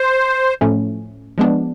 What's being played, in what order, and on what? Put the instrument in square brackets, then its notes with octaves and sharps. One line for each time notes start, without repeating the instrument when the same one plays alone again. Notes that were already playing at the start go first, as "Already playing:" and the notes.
Already playing: [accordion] C5
[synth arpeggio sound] A2 F3 A3 C#4
F3 G#3 B3 D4